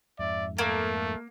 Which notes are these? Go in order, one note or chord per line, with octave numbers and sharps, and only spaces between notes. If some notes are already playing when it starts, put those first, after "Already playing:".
F2 G#2 D5 E5
A3 A#3 A4